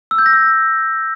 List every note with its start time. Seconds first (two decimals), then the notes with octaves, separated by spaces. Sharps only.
0.11 E6
0.18 G6
0.26 A#6
0.33 E6